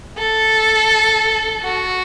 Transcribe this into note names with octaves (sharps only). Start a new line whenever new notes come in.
A4
F#4